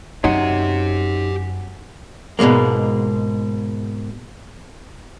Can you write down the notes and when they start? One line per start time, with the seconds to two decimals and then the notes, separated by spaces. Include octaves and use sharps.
0.24 F#2 C#4 D#4 F#4 G4 C6
2.39 G#2 B2 D#3 G#3 A#3